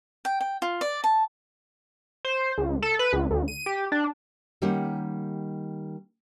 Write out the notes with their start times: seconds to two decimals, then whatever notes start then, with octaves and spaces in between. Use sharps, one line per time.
0.25 G5
0.41 G5
0.62 F4
0.81 D5
1.04 A5
2.25 C5
2.58 C#2
2.82 A4
2.99 B4
3.13 C#2
3.31 D2
3.48 D#7
3.66 G4
3.92 D4
4.62 D#3 G3 A#3 C#4 G4 F#5